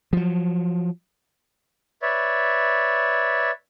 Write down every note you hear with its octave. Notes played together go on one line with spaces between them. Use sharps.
F3 F#3
B4 C#5 D5 E5